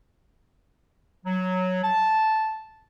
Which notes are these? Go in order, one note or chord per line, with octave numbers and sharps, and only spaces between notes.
F#3
A5